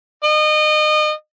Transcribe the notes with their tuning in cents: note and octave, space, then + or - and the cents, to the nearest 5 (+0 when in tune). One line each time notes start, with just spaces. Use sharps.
D#5 -30